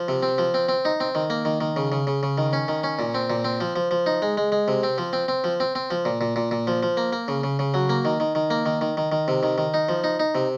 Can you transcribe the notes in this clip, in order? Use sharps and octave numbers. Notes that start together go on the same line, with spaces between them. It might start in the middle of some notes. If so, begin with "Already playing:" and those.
Already playing: F3
C3
C4
F3
C4
C4
D#4
C4
D#3
A#3
D#3
D#3
C#3
C#3
C#3
C#3
D#3
C#4
D#3
C#4
A#2
C4
A#2
C4
F3
F3
F3
D#4
G#3
G#3
G#3
C3
C4
F3
C4
C4
F3
C4
C4
F3
A#2
A#2
A#2
A#2
F3
F3
A#3
A#3
C#3
C#3
C#3
F#3
A#3
D#3
D#3
D#3
A#3
D#3
D#3
D#3
D#3
C3
D#3
D#3
D#4
F3
D#4
D#4
C3